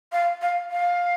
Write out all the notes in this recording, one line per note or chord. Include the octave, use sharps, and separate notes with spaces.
F5
F5
F5